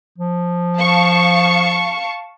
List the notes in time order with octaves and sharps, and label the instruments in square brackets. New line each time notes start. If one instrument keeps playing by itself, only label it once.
[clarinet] F3
[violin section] F5 A5 C#6